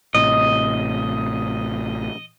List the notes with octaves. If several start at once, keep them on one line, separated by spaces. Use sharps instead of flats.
A1 A2 C3 D#5